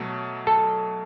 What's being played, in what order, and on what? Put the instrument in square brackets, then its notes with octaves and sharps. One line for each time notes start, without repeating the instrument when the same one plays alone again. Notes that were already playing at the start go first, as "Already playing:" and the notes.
Already playing: [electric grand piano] B2 F#3 A3
[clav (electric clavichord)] A4